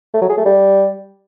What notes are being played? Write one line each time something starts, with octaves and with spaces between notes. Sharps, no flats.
A3
F#3
G#4
A3
G3